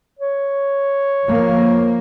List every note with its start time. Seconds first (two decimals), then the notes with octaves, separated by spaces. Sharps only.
0.19 C#5
1.26 F3 A#3